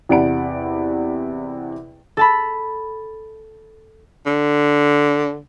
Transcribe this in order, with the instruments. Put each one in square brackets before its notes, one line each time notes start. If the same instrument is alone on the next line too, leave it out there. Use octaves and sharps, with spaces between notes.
[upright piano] E2 C3 D5 F#5 B5 D7
[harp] A4 A5 B5
[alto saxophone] D3